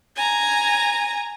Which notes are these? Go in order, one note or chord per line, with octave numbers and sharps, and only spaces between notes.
G#5 A#5